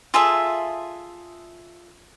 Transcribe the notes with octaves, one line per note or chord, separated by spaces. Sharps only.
F4 G#4 A4 E5